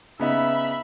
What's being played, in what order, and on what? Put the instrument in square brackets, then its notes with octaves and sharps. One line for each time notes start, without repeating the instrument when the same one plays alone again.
[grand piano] C#3 B3 D#4 [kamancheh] E5 B5